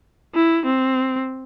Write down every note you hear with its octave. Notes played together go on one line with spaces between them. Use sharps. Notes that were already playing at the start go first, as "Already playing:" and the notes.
E4
C4